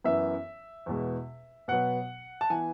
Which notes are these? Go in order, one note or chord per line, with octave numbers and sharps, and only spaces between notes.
F#2 E3 B3 E5
E2 B2 G#3
B2 F#3 B3 F#5
A5
E3 B3 G#5